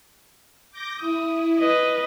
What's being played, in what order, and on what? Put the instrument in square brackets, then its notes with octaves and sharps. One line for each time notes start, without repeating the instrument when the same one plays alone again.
[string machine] D6 G6 A#6
[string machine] E4 [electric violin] D#6
[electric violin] B4 D#5